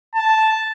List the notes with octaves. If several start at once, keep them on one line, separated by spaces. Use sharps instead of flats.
A5